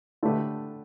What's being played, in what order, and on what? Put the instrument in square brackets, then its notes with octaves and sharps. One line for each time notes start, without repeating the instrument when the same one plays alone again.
[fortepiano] D3 A3 G4 B4